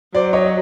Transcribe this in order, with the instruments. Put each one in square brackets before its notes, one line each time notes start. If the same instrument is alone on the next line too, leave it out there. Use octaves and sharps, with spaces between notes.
[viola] F#3 [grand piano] C5 D5
[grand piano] C#5 D#5